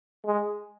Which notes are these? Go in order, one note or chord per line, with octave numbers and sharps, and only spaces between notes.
G#3